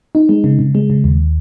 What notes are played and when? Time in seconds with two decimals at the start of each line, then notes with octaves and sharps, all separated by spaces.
0.15 D#4
0.29 G#3
0.44 C#3
0.59 C#3
0.75 G#3
0.90 C#3
1.04 D#2